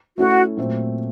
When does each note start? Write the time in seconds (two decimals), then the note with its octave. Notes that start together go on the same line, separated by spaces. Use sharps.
0.17 A3 C#4 E4 F#4 A4
0.57 A#2 F#3 A3 C4